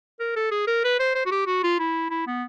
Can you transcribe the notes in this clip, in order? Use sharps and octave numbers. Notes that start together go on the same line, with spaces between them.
A#4
A4
G#4
A#4
B4
C5
C5
F#4
G4
F#4
F4
E4
E4
B3